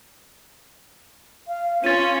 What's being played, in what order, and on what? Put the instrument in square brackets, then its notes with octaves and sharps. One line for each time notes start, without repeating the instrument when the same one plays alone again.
[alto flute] F5
[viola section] C#4 [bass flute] F4 [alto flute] F5 [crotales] A6 D#7